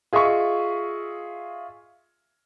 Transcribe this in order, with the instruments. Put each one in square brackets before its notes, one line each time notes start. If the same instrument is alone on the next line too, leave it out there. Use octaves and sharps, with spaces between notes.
[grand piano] F4 G#4 D#5 E5 C#6